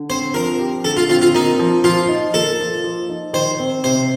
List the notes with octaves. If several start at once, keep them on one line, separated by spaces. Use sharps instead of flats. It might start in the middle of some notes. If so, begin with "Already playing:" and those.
Already playing: D3
C4 C5
F3 A#4
G4
D3 A4
F4
C4 F4
F4
A#3 D#4
F3
F3 F4
D#4
A#3 A4
F3
F3
D#4
D#3 C5
C4
C3 C5